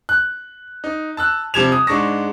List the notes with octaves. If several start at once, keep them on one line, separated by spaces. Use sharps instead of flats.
F#6
D#4
A5 E6 F#6
C3 F3 G3 G#6 E7 F7
D#6
G#2 G#3 D4 C#6 A#6